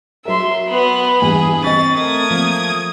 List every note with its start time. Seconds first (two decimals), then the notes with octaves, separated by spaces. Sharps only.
0.25 F#3 A#4 E5 C6
0.69 B3 B5
1.22 E2 G2 G#4
1.64 C4 D#5 C#6 A6 B6
1.95 A3 A#4 D#6 G#6
2.31 F3 A#3